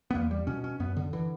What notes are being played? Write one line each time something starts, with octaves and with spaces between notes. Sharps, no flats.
B3
E2 A#3
G3
B2 C#4
C#4
F#2 B3
D3
D3 E3